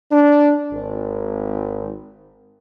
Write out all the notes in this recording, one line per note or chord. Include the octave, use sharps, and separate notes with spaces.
D4
G#1